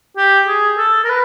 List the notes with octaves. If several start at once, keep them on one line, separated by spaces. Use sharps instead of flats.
G4
G#4
A4
A#4
B4